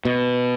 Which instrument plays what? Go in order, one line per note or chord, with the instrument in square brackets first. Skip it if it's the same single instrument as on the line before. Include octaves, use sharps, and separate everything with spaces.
[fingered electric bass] B2